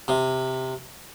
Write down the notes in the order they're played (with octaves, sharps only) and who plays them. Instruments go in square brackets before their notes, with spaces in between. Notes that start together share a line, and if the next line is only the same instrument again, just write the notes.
[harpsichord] C3